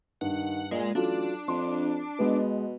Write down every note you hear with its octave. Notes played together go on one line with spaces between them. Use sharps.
G2 D#3 F#5
A#2 G#3
A1 F#3 D4 F4 A4
F2 C6
B2 G#3 B3